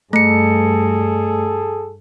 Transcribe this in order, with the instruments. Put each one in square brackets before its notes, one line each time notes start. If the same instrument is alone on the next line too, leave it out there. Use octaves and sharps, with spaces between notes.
[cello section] G2 [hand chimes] A3 C#7 [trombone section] G#4 A4